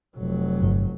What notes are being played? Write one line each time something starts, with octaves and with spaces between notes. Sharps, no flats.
F1 F#3
G1